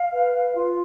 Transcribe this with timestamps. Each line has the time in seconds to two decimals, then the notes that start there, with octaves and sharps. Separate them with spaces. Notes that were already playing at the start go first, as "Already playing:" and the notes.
Already playing: F5
0.11 B4
0.34 B4
0.56 F4